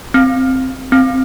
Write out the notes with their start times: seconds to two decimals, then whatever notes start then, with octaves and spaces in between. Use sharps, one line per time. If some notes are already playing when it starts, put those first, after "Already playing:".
0.14 C4
0.92 C4